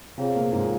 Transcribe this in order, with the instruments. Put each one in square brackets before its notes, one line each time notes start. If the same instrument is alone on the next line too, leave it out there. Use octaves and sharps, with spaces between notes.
[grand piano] C3 C4 [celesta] F4 G#4 C#5 F5
[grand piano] A#2 A#3
G#2 G#3